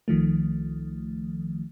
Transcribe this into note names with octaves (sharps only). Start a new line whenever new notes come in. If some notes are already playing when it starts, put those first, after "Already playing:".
C2 D#3 F3 A3